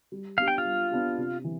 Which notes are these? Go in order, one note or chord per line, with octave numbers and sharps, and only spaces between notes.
G3
B3 D4 G4 F5
G5
F4 F5
G3
B3 D4 G4
C3
E3